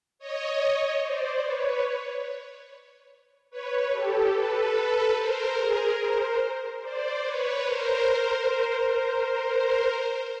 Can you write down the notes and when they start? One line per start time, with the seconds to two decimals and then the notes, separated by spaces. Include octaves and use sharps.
0.19 C#5 D#5
1.02 C5 D5
1.43 B4 C#5
3.51 B4 C#5
3.92 G4 A4
4.33 A4 B4
5.16 A#4 C5
5.58 G#4 A#4
5.99 A#4 C5
6.82 C5 D5
7.23 B4 C#5
7.65 A#4 C5